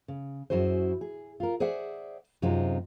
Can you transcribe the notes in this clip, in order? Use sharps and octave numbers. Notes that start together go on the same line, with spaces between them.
C#3
F#2 E4 F#4 G#4 C5
G#4
F4 A#4
G#4 C5 D5 E5 F#5
F#2 C3 G#3 C4 D#4 F4